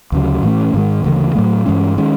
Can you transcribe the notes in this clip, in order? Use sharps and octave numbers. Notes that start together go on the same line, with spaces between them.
D2 C#3 F#3
A2 E3 A3 C#4
G#2 D#3 G#3
D2 C#3 E3
A2 F#3 A3
G2 E3 G#3 C#4
D#3 G#3 C#4